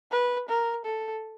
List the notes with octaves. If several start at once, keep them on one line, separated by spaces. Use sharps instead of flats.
B4
A#4
A4